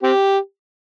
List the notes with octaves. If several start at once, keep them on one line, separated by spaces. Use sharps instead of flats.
C4 G4